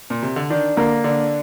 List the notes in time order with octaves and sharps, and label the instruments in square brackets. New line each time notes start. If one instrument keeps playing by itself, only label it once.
[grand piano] A#2
C3
D3
[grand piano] D#3 [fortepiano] D4
[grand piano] D3 [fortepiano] A#3
[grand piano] D3 [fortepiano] D4